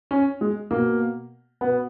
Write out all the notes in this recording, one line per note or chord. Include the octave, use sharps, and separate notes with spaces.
C#4
G#3
B2 A#3
B2 B3